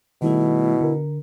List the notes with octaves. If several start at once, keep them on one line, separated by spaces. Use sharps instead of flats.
B2 D#3 G3 A3 E4
D3 A#4